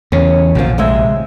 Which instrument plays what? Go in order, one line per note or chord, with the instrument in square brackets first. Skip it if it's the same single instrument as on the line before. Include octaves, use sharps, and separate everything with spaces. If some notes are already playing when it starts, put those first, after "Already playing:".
[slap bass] E2 C#3 [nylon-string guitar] C#4
[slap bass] A#1 A#2 D3 [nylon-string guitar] F#2 F3
[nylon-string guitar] C3 G#3 E5